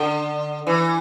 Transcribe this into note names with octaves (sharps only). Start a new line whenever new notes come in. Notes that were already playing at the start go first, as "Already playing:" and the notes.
Already playing: D3
E3